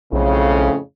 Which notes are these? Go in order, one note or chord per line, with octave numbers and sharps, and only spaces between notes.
B1 F2 A2 C#3